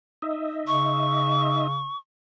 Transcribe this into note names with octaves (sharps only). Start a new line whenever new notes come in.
D#4 D#5 E5
C#3 C#6